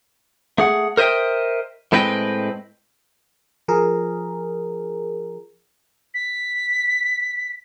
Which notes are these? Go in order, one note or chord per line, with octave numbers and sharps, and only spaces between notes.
A3 G#4 F#5
A#4 C5 D#5 E5 G5
A2 G#3 C4 B4 D#5 G5
F3 G#4 A#4
B6